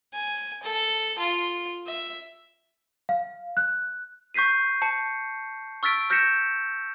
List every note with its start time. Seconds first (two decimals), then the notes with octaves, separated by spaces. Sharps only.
0.13 G#5
0.63 A4
1.19 F4
1.86 E5
3.09 F5
3.57 F#6
4.34 C#6 G6 B6 C7 D#7
4.82 A5 C#7
5.83 C#6 E6 F6 A6 B6 D7
6.10 F6 G6 A#6 B6 C#7 E7